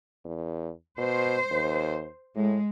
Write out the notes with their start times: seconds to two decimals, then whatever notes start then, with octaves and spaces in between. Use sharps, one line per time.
0.25 E2
0.98 B2 C5
1.51 D#2
2.36 A2 G#3